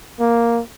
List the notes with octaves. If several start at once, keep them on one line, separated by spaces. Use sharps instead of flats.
A#3